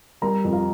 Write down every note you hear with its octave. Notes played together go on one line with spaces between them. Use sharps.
G3 A#4 A#5
F2
F4 F5